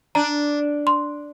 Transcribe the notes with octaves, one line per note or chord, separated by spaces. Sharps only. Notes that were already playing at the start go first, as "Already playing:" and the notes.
D4 A#5
C6